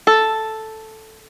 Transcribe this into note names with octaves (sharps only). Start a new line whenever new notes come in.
A4